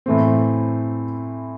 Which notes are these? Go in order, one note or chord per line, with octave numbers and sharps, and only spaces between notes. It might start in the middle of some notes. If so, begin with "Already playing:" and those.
A2 E3 A3 C4